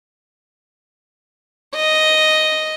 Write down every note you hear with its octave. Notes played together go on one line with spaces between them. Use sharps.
D#5